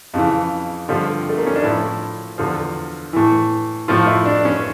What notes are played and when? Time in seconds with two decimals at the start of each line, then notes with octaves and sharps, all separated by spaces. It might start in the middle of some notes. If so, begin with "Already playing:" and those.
0.14 F2 C#3 E3
0.89 G2 D3 F3 G4
1.29 A3
1.38 A#3
1.47 C#4
1.55 D4
1.63 A2 F3 E4
2.38 E2 D3 F3
3.13 A2 E3
3.88 A2 F3 F4
4.07 E4
4.25 D4
4.45 C#4